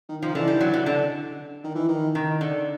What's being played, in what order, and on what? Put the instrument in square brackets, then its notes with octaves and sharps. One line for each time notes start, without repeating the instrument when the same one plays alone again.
[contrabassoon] D#3
[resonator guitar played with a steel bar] F3
[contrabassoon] D#3
[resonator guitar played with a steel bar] D3 [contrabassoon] E3
[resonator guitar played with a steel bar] G3
F#3
D3
D3
[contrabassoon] D#3
E3
D#3
[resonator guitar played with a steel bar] D#3
D3